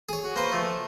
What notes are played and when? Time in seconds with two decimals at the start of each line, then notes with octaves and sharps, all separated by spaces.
0.09 G#4 C#5
0.23 F#4
0.36 A#3 B4 C5
0.52 F3 A3